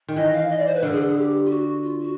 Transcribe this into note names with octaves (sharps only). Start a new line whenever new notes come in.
D#3
E3 D#5
F5
D#5
D5
C5
B4
D3 A#4
G#4
A4
G#4
G4
F4
F#4
F4
F#4